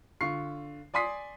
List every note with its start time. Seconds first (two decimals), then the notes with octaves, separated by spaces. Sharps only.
0.21 D3 F4 C#6 C7
0.94 D5 G#5 C6 D#6 B6 C7